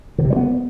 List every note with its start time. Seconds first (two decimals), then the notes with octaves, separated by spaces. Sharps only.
0.18 D3
0.24 C3
0.30 G3
0.36 B3